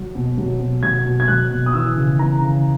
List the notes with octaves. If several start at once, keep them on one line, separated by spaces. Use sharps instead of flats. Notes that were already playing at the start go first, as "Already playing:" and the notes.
Already playing: F#3
B2
F#3
B2
F#3 G#6
B2
G#6
F#3 F#6
B2
D#6
E3 E6
C#3
E3 A#5
C#3